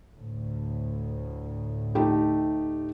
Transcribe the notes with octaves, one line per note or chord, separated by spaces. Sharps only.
D2 A2
A3 D#4 G4